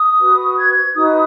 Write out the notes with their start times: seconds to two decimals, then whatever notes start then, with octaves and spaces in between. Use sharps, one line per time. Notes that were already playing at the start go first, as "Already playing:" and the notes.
Already playing: D#6
0.19 F#4 B4
0.58 G#6
0.96 D#4 F#4 B4 D#6